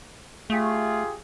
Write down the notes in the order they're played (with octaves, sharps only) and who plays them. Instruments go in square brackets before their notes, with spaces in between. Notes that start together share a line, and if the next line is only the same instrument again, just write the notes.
[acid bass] A3 [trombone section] F4 G4 G#4